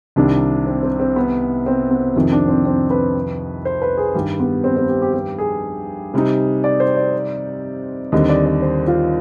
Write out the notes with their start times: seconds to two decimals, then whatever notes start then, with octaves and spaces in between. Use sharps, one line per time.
0.16 C2 C3 D#3 D4
0.67 C4
0.83 C4
1.00 C4
1.16 B3
1.66 C4
1.91 B3
2.16 F2 C3 D#3 C4
2.32 D4
2.48 C4
2.65 C4
2.90 B4
3.65 C5
3.82 B4
3.97 G#4
4.15 G2 D#3 G3 G4
4.40 B3
4.64 C4
4.77 C4
4.89 G4
5.02 G4
5.13 G4
5.38 G#4
6.14 C3 G3 C4 D#4
6.64 D5
6.80 C5
6.96 D5
8.12 D#2 D3 G3 C4 D#5
8.29 D5
8.46 D5
8.62 C5
8.88 F4